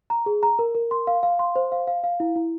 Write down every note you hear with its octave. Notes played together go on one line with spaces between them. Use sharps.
A#5
G#4
A#5
A#4
A#4
C6
F5
F5
C6
C5
F5
F5
F5
E4
E4